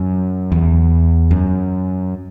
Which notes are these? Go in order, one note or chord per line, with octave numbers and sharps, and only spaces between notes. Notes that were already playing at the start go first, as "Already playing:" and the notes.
Already playing: F#2
E2
F#2